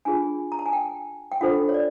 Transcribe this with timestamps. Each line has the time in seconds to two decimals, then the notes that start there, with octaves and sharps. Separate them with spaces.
0.05 D4 F4 G#4 G#5
0.52 A#5
0.59 A5
0.66 G#5
0.73 G5
1.32 G5
1.41 D4 F4 A4 C5 F#5
1.69 C#5
1.74 D5